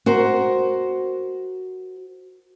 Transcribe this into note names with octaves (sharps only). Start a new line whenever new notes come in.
F#4 A#4 C5